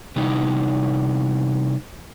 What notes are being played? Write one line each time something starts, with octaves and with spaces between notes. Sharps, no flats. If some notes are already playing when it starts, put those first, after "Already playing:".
C3 E3 G3 D#4